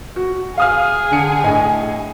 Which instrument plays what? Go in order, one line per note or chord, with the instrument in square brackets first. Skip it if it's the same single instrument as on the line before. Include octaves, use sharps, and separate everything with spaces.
[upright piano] F#4
[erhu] G#4 [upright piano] F5 D#6 F6
[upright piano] D3 C#7
A2 D#5 G#5